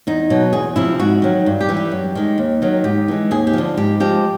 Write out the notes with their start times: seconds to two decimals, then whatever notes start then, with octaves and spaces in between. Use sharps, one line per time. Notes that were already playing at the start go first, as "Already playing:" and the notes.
0.07 E2 D#4
0.30 B2 F#3
0.53 E2 G#4
0.76 C3 F3 E4
0.99 G#2 F#4
1.22 D#3 F#3
1.46 G2
1.61 G4
1.69 E3 G3
1.77 G4
1.91 F#2
2.15 D#3 G#3
2.38 D#2
2.62 D#3 F#3
2.84 G#2 G4
3.08 E3 G#3
3.31 D#2 G#4
3.47 G4
3.53 D3 F3
3.77 G#2 G4
4.00 F3 G#3 G4